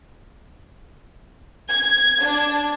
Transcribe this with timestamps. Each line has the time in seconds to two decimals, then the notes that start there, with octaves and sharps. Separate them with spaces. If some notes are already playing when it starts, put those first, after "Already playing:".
1.69 G#6
2.23 D4